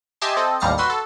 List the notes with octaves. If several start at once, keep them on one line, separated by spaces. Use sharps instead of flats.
G4 D#5 E5 G#5 A5 C6
C4 A4 D#5
A1 D#2 G3 F5 A#6 C#7
F#4 B4 C6 E6
A4